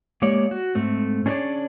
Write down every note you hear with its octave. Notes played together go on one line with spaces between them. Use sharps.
G#3 A#3 G4 C#5 D5
F#4
G#2 A3 C4
C#4 D4 G#4 B4 C#5 D5